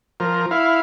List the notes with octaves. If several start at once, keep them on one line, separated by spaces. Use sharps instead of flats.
F3 A#4
E4 F5